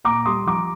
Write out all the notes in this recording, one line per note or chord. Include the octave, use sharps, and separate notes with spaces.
A#2 A#5 D6
G3 C6 D#6
F3 A#5 D6